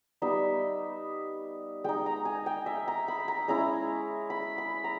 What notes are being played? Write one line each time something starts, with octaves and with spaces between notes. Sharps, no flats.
G3 B3 D#4 E5
G#3 D#4 G5
A#5
G#5
G5
E5
A#5
B5
A#5
G#3 C#4 E4 A#5
B5
B5
A#5